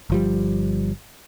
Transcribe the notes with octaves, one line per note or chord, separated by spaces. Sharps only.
G1 F3 G3